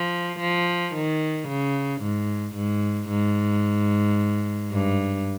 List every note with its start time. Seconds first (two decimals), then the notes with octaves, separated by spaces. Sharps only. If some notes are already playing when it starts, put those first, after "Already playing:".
Already playing: F3
0.40 F3
0.95 D#3
1.48 C#3
2.02 G#2
2.56 G#2
3.09 G#2
4.72 G2